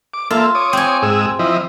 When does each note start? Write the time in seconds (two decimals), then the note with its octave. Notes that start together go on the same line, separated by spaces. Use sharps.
0.14 D6
0.31 A#3 F4 A4 E5
0.55 C#5 D6 D#6
0.73 C4 G#5
1.02 G#2 G#4 E6
1.39 F3 E4 D#5